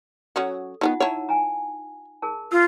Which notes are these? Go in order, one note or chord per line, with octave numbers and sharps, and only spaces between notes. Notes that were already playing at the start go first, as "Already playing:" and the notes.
F#3 C#4 F#4 A4
D#3 F3 B3 D#4 F4 F#5
E4 C#5 F#5 A5 A#5
G#5 A#5
G#4 A#4 A5
F4 E6